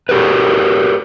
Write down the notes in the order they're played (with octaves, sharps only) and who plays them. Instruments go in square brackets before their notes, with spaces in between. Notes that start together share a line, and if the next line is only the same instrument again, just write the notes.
[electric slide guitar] F#4 G4 A#4 B4